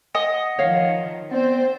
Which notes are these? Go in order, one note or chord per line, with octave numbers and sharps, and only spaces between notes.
D#5 F#5 G#5
D#3 F3 C#5 F5
B3 C4 C5 D5